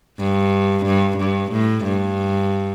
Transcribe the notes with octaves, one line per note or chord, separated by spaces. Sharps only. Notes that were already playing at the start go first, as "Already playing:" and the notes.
G2
G2
G2
A2
G2